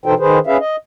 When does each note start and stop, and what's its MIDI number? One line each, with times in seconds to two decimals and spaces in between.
0.06 0.14 47
0.06 0.14 52
0.06 0.14 63
0.06 0.14 69
0.06 0.14 72
0.06 0.14 79
0.19 0.39 51
0.19 0.39 68
0.19 0.39 71
0.19 0.39 72
0.47 0.57 61
0.47 0.57 68
0.47 0.57 71
0.47 0.57 76
0.47 0.57 77
0.60 0.76 75